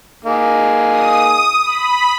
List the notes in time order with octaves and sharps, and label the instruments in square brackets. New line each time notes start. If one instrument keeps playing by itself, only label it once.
[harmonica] A#3 D#4 G#4
[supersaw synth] D#6
B5